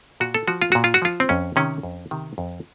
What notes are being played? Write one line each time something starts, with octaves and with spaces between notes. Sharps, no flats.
A#2 F#4
A4
F3 F#4
F4
A#2 F#4
F4
F#4
F3 F4
C4
F2 C#4
C3 D#3 C#4
F2
C3 D#3
F2